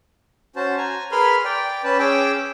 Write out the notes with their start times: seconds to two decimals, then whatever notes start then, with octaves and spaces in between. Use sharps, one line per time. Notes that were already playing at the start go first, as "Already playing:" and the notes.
0.56 C#4 F#4 C5 A5
0.78 G#5 A#5
1.12 G#4 A#4 B4 B5 C6 F6
1.45 D5 G5
1.84 C#4 B4 A5
1.99 C#4 G#4 G5 D6 E6